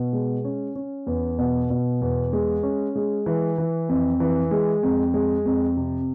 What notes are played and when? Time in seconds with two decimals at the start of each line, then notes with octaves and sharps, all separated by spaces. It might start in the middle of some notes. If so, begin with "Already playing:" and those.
Already playing: B2
0.13 G#3
0.45 C#4
0.75 C#4
1.07 E2
1.38 B2
1.70 B2
2.01 E2
2.33 G#3
2.63 C#4
2.96 G#3
3.26 E3
3.58 E3
3.89 F2
4.20 E3
4.51 G#3
4.83 F2
5.14 G#3
5.45 F2
5.77 C3